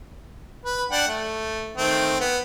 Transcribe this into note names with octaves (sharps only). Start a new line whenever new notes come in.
B4
D4 F#5 G5
A3
D#3 A3 C4
B3